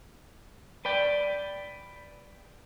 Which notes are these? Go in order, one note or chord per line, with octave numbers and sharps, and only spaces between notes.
B4 D5 G5